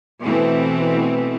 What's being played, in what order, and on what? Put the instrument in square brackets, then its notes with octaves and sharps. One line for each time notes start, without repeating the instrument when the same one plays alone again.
[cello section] B2 E3 A3 C4